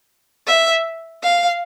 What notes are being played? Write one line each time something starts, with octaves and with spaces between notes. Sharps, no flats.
E5
F5